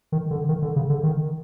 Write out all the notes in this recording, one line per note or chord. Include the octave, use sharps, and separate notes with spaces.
D#3
D3
D#3
D3
C#3
D3
D#3